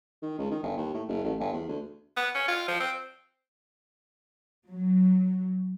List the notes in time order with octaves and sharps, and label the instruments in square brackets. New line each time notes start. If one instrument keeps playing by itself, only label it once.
[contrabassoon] D#3
C#2
D#3
G1
D#2
A2
F#1
A1
G1
E2
D2
[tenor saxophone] B3
C#4
F4
F3
C4
[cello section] F#3